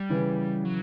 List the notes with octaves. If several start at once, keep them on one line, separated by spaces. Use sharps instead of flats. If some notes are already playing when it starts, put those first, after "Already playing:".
Already playing: G3
C#3 E3
F#3